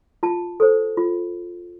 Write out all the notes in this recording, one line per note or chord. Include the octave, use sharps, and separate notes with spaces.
F4 A5
A4 C5
F4